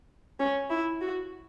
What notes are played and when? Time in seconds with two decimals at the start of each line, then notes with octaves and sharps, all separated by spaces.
0.40 C#4
0.70 E4
1.01 F#4